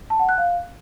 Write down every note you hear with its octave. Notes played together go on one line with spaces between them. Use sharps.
A5
F#5
F#6
F5